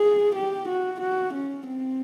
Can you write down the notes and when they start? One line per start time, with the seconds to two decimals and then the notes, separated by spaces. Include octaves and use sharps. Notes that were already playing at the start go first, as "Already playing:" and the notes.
Already playing: G#4
0.35 G4
0.68 F#4
1.01 F#4
1.34 C#4
1.67 C4